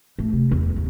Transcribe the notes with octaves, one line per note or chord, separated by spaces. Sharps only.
A3
C3
E2
D#2